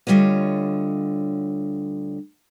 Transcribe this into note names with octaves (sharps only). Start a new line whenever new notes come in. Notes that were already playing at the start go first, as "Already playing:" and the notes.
D2 D3 G3 F4 C#5 D#5